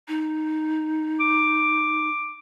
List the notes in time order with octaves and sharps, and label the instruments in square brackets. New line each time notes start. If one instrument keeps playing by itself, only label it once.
[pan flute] D#4
[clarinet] D6